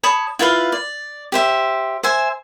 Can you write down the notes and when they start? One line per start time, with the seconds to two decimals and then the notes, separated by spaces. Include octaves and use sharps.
0.03 C#5 A5 B5 D#6
0.39 E4 F4 B4 F5
0.72 D5
1.32 G4 C5 E5
2.03 C5 E5 G#5